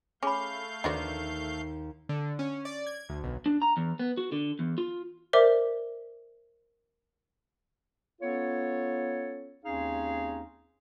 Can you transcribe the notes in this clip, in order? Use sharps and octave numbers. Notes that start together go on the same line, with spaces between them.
A3 C#4 G#4 F5 B5 G6
D#2 D4 F#4 G#4 B4 C5 D#5
D3
C#4
D5
G#6
D2
B1
D4
A#5
E2
B3
F#4
D3
E2
F4
A#4 C5 D5 E5 D6
B3 C#4 F4 A4 C#5
D#2 C4 C#4 D#4 G#4 F5